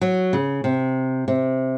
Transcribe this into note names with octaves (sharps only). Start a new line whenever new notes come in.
F#3
C#3
C3
C3